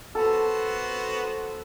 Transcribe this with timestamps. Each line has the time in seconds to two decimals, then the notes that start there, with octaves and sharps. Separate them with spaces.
0.15 B3 F#4 A4 C5